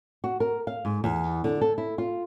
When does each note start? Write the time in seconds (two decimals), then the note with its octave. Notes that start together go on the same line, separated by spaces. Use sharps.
0.24 F#4
0.40 A#4
0.67 F5
0.85 G#2
1.04 E2
1.44 D3
1.61 A4
1.78 E4
1.98 F4